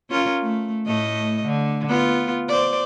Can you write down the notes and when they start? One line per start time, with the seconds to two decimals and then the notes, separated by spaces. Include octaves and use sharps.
0.11 C#4 F4 A#4
0.42 A3
0.86 A2 A3 D#5
1.46 D3
1.88 B3 F4
2.49 C5 D5